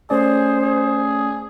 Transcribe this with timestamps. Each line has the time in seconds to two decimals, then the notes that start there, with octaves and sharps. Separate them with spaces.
0.10 A3 C#4 G#4 C5 D5
0.61 G#4